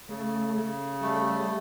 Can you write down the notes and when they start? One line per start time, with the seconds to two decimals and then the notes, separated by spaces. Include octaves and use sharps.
0.09 C#3 A3
0.55 C#3
1.01 G3 A3